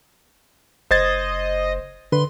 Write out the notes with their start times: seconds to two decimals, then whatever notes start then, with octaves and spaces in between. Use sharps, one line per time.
0.91 F#1 C5 D#5 G#6 A6
2.12 D3 B4 C6